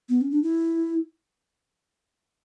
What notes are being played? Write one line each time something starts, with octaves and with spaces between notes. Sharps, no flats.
B3
C#4
D4
E4